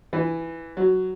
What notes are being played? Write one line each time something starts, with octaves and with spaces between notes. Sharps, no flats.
E3
F#3